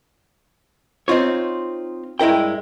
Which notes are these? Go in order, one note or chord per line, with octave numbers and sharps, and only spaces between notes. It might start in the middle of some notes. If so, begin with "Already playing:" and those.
C4 D#4 F4 C#5
G2 G#3 E4 A#4 G5